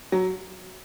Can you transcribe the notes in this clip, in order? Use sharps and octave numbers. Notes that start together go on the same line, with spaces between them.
F#3